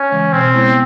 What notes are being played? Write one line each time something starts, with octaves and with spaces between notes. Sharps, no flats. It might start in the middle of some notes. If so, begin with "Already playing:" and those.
Already playing: C#4
C#3 E3 G#3
B2 C4
G#3 B3 E4